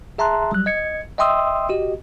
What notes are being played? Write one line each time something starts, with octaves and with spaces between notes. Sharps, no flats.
G#4 E5 A5 A#5 C6 F#6
F#3 G3 F#6
D#5 G#6 C#7
D#5 E5 G5 C6 D#6 E6
F#4 G4 D#5